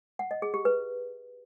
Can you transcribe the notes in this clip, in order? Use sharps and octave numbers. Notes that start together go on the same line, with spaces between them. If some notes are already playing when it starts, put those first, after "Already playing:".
F#5
D#5
G#4
G4
B4